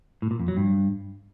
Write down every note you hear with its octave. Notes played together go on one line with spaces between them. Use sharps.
A2
A#2
F2
F#3
G2